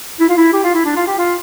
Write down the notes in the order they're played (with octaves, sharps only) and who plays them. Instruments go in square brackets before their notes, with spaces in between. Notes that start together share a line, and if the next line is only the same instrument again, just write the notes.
[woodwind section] E4
F4
E4
G4
F4
E4
D4
F4
G4
F4